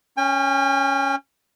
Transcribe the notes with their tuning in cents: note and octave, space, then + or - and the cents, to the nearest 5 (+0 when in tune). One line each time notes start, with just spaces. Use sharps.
C#4 +0 G5 +45